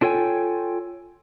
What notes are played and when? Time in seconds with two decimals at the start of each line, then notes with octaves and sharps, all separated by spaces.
0.01 D4 F4 A4 C#5 G5 G#5